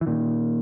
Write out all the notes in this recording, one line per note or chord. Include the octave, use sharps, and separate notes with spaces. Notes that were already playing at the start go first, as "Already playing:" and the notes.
E3
A#2 D#3